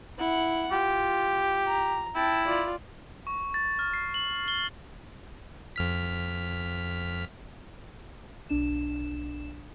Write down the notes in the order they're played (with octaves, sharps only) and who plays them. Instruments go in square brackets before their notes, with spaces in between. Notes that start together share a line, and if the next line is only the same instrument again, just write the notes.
[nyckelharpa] E4 F#5
[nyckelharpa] F4 [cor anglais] G4
[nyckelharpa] A#5
[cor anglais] E4 [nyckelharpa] G5 A5
[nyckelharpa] F4 D5
[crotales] C#6
A6
F6
C7
F#7
G7
[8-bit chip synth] F2 F6 B6
[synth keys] B1 D4 E7